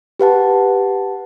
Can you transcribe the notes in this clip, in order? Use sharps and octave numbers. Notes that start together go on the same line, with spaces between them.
G4 B4 F#5 A5